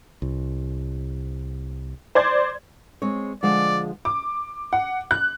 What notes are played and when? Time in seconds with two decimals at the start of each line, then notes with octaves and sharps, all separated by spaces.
0.22 C2
2.15 C5 D5 G#6
3.02 G#3 C4 C#5
3.43 D3 F3 G#3 D5
4.05 D6
4.73 F#5
5.11 F#6